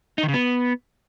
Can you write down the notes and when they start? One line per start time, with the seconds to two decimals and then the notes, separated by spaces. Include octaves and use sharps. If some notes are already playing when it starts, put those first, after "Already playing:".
0.18 D#4
0.23 D#3
0.28 C#3
0.34 B3